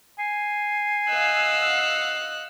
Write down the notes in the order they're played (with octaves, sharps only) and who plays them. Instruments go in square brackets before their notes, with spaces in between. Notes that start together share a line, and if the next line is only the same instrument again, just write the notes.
[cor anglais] G#5 [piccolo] C7
[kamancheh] D#5 F#6 [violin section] F5 F#5 E6